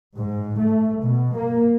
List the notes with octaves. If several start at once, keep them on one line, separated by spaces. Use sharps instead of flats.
G#2
A3
B2
A#3